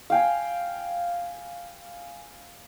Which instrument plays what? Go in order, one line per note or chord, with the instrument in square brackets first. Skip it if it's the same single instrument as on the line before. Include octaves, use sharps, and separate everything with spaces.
[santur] F5 G5 G#5